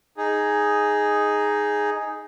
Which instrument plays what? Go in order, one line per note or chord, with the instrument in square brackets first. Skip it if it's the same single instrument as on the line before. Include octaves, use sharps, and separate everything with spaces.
[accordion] D#4 G#4